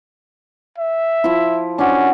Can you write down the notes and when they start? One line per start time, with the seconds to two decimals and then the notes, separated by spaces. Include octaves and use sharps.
0.78 E5
1.24 F3 E4
1.79 C#4 D4 F#4